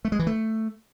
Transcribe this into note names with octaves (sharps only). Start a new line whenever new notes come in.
A3
G#3
E3
A3